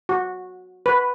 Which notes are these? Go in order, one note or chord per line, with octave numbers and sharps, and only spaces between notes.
F#4
B4